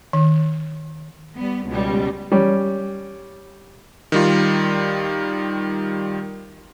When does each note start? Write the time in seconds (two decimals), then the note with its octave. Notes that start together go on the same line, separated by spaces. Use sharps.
0.13 D#3
1.37 G3 B3
1.67 C#2 B2 G3
2.32 G3 C#4
4.12 D#3 G3 F4